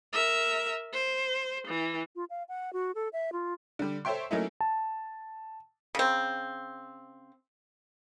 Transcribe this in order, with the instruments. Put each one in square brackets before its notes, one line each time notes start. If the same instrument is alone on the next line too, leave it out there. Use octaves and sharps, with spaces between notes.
[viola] A#4 E5
C5
E3
[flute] F4
F5
F#5
F#4
A4
E5
F4
[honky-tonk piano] D3 G3
A4 C5 C#5 E5 G5 C6
F#3 A3 A#3 C#4 D#4 E4
[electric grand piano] A5
[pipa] C#3 C4